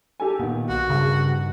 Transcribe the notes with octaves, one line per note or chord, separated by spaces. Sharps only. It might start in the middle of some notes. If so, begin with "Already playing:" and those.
G4 A4 G#5
A#2 D#3 B3
B1 F#4
G2 C#3